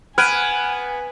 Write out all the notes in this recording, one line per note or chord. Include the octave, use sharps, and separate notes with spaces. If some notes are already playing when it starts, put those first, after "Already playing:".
B3 G#5 B5 F6 F#6 G#6 D7 D#7